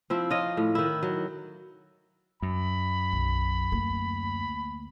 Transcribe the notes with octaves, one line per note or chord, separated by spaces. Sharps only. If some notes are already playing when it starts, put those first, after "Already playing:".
F3 C4 E4
F4 C#5 D#5
A2
D#3 E4
F#3
F#2 B5
B1
D2 A#3